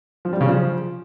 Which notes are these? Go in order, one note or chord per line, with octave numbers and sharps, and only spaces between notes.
F3
G3
C#3
F3